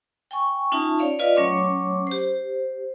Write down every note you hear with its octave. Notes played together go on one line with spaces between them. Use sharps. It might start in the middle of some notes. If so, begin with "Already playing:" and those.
G5 G#5 C#6
C#4 D#4 F4 E5 A5
C#5 D5 E5 F5
F4 B4 D5 D#5 F5
F#3 A3 C#4 C#5 C6 D6
G4 C5